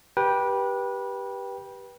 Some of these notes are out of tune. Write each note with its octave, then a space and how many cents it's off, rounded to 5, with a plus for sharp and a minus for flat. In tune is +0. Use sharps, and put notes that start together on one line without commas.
G4 +0 B4 -25 G5 +0